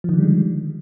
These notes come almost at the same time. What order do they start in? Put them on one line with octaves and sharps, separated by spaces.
F3 D#3 D3 G3 G#3